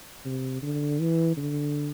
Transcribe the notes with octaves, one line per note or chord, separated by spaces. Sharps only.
C3
D3
E3
D3